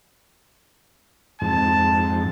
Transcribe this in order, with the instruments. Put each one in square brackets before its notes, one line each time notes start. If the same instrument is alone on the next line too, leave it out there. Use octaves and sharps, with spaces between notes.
[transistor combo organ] F2 G#2 [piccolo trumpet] A5